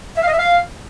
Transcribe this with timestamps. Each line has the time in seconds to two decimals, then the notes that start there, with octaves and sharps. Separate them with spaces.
0.16 E5
0.22 F5
0.27 D#5
0.33 E5
0.39 F5